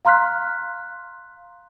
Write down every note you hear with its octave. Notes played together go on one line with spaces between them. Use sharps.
F5 A#5 C6 F6 F#6 B6